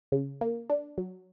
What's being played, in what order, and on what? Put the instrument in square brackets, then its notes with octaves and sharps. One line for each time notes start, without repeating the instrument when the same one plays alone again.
[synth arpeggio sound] C#3
A#3
D4
F#3